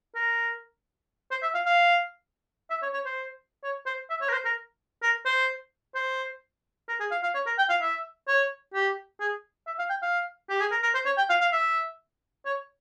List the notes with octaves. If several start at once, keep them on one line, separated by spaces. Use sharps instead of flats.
A#4
C5
E5
F5
F5
E5
C#5
C#5
C5
C#5
C5
E5
C#5
A#4
C5
A#4
A#4
C5
C5
A#4
G#4
F5
F5
C#5
A#4
G5
F5
E5
C#5
G4
G#4
E5
F5
G5
F5
G4
G#4
A#4
A#4
C5
C#5
G5
F5
F5
E5
C#5